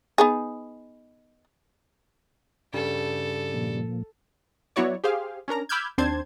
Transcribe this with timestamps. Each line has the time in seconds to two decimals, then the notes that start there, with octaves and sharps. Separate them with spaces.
0.18 B3 D#4 G#4
2.74 G2 C#3 G3 A4
3.54 A#2 F3 A#3
4.76 F#3 B3 E4 F#4 C#5 D5
5.04 G4 G#4 C5 F5
5.48 C#4 D4 A#4 A#5
5.69 B5 D6 E6 F6 G6 G#6
5.98 D#2 C4 D4 C5 A5 G#6